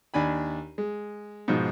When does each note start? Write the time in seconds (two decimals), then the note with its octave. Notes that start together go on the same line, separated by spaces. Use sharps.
0.14 D#2 D4 G#5 B5
0.78 G#3
1.48 G#2 B2 F3